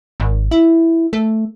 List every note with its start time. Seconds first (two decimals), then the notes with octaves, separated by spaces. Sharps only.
0.20 G#1
0.51 E4
1.13 A3